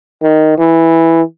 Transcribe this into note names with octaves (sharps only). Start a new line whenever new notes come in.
D#3
E3